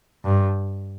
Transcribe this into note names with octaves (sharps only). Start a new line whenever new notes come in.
G2